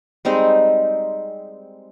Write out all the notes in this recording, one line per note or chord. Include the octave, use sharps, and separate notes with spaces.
G3 G#3 C4 D#4